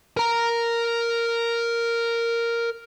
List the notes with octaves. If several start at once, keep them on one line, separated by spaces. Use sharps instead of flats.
A#4 A#5